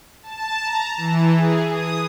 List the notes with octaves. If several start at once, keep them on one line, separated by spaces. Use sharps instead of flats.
A5
A#5
E3
G#4
D#6